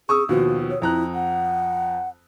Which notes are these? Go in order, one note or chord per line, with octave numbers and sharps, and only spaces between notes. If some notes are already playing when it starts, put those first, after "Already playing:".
G#4 C#6 D#6 E6
D#2 B2 F3 F#4
C#5
F2 E4 A#5 F#6
F#5